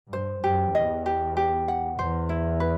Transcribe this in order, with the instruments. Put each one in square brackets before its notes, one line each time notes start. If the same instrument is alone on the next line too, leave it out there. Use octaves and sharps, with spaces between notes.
[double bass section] G2 [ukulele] C5
[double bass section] F#2 [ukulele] G4
[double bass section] E2 [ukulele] D#5
[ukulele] G4
G4
F#5
[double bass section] E2 [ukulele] C5
[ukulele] E4
B4